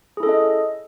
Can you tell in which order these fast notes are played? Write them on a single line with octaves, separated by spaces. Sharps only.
G#4 E4 A4 C#4 D#5